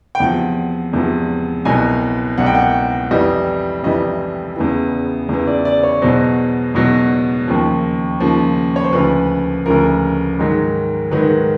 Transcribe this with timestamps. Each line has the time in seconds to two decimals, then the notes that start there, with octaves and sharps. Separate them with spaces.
0.15 G5
0.20 E2 C3 F3 F#5
0.93 E2 C3 F3
1.65 C2 B2 F#3 G#5
2.38 C2 B2 F#3 F#5
2.46 G5
2.55 F#5
3.11 F2 C3 E3 G3 D#5
3.83 F2 C3 E3 G3 D#5
4.56 E2 C#3 E3
5.29 E2 C#3 E3
5.47 D5
5.65 D5
5.83 C#5
6.02 E2 B2 F#3 C5
6.74 E2 B2 F#3
7.48 D#2 C#3 F3
8.20 D#2 C#3 F3
8.76 C#5
8.84 C5
8.93 D2 C#3 F3 B4
9.66 D2 C#3 F3 A#4
10.39 G#2 D#3 F#3
11.11 G#2 D#3 F#3 B4